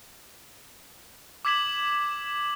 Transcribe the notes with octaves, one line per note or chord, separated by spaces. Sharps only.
D6 E6 G#6 B6 E7 F#7